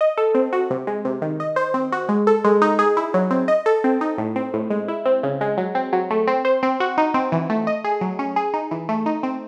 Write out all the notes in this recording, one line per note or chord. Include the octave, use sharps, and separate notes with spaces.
D#5
A4
C4
F#4
C3
G#3
C3
D#3
D#5
C5
C4
F#4
G#3
A4
G#3
D#4
G#4
E4
F#3
C4
D#5
A4
C4
D#4
A2
C4
A2
G#3
E4
C4
C#3
G#3
F#3
C4
F#3
A3
C4
C5
C4
F#4
D#4
C4
E3
A3
D#5
G#4
F#3
C#4
G#4
D#4
E3
A3
D#4
C4